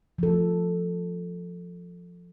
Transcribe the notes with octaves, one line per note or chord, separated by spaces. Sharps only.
F3 A4